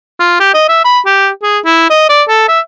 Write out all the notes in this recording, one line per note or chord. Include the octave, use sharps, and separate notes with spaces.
F4
G4
D#5
E5
B5
G4
G#4
E4
D#5
D5
A4
E5